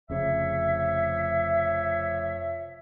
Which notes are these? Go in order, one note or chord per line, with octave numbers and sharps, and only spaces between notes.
F1 C#3 F3 C#5 E5